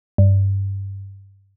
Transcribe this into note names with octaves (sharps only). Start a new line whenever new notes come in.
G2